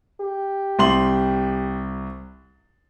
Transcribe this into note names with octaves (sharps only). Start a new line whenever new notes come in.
G4
C2 C6 F#7